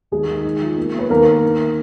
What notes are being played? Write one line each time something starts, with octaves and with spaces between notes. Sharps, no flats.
D#2 G#3 G#4
D#3
D#4
F3
A#3
A#3 B4
D#2 A#3 A#4
D#2
D3